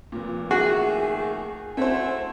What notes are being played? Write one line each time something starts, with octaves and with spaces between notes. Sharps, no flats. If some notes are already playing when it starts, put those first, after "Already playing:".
F1 A#2
D#3 A3 F#4 G#4
A3 C4 E4 F#4 C5